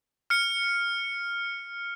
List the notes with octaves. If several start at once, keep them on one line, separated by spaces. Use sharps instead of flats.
F6 C#7